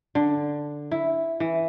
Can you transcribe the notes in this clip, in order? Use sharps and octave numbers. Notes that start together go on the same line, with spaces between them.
D3
E4
E3